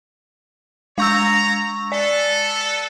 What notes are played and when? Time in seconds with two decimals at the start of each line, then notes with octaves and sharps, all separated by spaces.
0.98 G#3 C#5 A#5 C#6 E6
1.92 B3 A4 D5